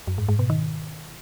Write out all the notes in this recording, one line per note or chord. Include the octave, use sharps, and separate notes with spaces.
F#2
G#2
G#2
B2
D#3